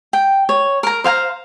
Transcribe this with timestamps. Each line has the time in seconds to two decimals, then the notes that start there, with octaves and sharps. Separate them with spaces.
0.13 G5
0.49 C#5
0.83 A#4 A#5
1.04 C5 F5 G5 A#5